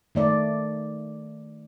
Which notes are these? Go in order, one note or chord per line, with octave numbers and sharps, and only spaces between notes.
D#3 A3 D5